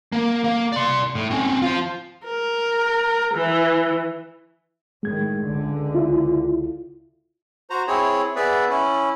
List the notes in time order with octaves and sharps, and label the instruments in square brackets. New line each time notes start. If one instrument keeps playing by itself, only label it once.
[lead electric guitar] A#3
A#3
D5 C6
A2
C4 C#4
F4 C5
[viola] A#4
E3
[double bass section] A2 D#3 [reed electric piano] G#3 G#6
[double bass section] C#2 D3
[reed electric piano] E4 F4
[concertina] F#4 C5 A#5
C4 E4 G#4 C#5
B3 G#4 B4 D5 E5
C#4 E4